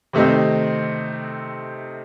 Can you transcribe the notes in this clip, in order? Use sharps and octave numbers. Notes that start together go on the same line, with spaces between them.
C3 D#3 A3 C4 D#4